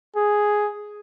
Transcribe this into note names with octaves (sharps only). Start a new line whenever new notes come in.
G#4